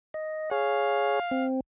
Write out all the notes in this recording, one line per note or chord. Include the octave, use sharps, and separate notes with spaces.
D#5
G#4 C#5 F5
C4